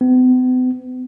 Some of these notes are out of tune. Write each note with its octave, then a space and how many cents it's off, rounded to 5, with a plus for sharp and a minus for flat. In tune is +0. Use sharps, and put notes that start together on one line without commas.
B3 +45